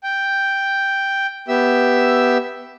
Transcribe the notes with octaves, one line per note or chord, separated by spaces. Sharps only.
G5
B3 G4 E5 E6